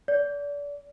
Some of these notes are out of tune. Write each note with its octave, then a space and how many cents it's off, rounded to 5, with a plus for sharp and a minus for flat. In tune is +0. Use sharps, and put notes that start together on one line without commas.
D5 -30